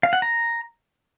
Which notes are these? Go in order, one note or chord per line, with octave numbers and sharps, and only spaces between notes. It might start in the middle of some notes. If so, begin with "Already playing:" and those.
F5
F#5
A#5